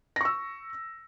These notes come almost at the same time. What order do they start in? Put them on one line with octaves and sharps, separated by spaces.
A#6 C#6 E6